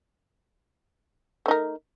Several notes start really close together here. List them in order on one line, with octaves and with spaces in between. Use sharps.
A3 D#4 A#4